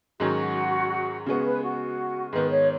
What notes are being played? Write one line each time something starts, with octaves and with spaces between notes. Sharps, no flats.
G#2 D#3 F#3 C#4 F#4
C#3 G#3 B3 F#4
B4
F#4
G#2 D#3 B3 B4
C#5